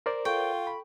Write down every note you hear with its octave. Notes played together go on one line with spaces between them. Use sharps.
A#4 C5 D5
F4 A4 G5 C#6 D7
B5